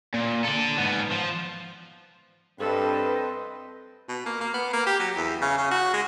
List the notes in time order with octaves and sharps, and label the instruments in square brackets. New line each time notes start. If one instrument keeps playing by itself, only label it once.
[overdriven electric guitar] A#2
A4 D5
G#2 B3
F3
[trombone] G2 [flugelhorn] C4 [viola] A4 [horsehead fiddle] B4 D#5
[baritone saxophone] B2
A#3
A#3
B3
A#3
G4
F#3
E2
C#3
C#3
F#4
G#3